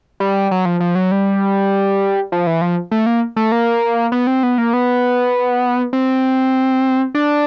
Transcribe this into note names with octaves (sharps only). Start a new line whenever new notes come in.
G3
F#3
F3
F3
F#3
G3
F3
E3
F3
A3
A#3
A3
A#3
B3
C4
B3
A#3
B3
C4
D4